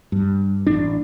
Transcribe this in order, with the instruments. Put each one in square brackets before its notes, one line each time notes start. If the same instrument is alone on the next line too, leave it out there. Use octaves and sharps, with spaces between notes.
[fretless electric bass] G2
A1 D4